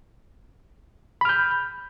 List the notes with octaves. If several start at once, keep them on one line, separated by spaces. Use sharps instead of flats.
B5 F6 G6